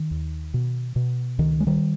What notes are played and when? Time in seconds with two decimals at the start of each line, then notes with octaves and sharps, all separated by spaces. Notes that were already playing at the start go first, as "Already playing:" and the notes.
Already playing: D#3
0.11 D#2
0.54 B2
0.96 B2
1.39 C#2 D#3
1.60 G#3
1.67 D#3 G3